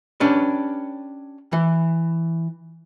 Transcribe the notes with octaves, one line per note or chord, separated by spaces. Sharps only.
C#4 D4 G4 B4
E3